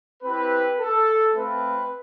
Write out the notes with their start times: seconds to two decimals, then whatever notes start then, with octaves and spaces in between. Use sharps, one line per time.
0.23 C4 E4 G4 B4
0.78 A4
1.34 A3 C4 F4 B4